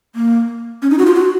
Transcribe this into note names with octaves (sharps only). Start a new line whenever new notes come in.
A#3
C#4
D#4
F#4
F4
F#4